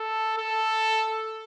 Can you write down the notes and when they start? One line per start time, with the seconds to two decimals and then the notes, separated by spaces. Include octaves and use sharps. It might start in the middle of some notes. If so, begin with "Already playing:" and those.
Already playing: A4
0.38 A4